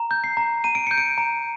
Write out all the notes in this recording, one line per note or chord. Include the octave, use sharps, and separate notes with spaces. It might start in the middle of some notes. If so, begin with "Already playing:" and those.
Already playing: A#5
G6
C7
A#5
A#5 D#7
D7
G6 C#7
D7
A#5